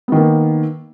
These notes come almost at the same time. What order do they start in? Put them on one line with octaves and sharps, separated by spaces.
B3 D#3 A#3